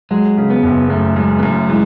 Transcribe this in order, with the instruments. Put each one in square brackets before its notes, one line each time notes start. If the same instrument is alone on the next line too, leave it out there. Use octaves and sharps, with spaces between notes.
[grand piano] F#3 [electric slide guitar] G#3
[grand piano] C#3
[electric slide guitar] B3
[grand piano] F#1
[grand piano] F#2 [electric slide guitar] A3
[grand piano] F#2 [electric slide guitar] G#3
[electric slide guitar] B3
[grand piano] F#2 [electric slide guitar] A3
[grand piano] E3 [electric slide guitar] G#3